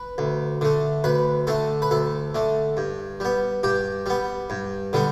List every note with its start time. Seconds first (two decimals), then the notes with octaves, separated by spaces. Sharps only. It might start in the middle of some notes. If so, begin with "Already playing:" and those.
Already playing: B4
0.18 D2
0.61 D3 A3
1.04 D2 B4
1.47 D3 A3 A4
1.82 B4
1.91 D2 A4
2.34 D3 A3
2.77 G2
3.20 G3 B3
3.63 G2 G4
4.06 G3 B3
4.50 G2
4.93 D3 G3 B3